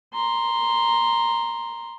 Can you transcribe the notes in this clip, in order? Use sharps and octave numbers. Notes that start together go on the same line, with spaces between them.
A#5 C6